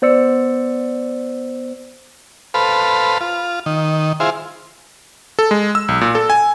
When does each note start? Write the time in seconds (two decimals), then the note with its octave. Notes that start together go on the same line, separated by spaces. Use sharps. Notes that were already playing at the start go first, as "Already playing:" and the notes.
0.02 B3 C5 D5 E6 C#7
2.54 A4 B4 C5 F5 B5
3.21 F4
3.66 D#3
4.20 E4 F4 G#4 C5
5.39 A4
5.51 G#3
5.75 E6
5.88 B1
6.01 A#2
6.15 A4
6.30 G#5